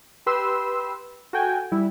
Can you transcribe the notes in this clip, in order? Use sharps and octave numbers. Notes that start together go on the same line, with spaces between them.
G4 B4 C6 E6
F#4 A4 G5 G#5
G3 E4